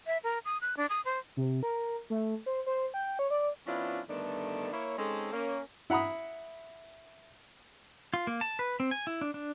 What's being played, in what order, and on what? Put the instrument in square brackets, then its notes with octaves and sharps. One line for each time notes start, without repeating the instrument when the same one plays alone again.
[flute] E5
A#4
D#6
F#6
D4
D#6
C5
[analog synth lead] C3
A#4
A3
C5
C5
G5
C#5
D5
[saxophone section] F3 B3 C#4 D4 E4 F4
G2 D3 D#3 A3 B3 D4
A#3 E4 C#5
G#3 C4 C#4 D#4 A4
A#3 C#4
[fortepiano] E4 F#5 A#5 B5 D#6
[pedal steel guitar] F4
A#3
A5
B4
C4
G#5
E4
D4
D4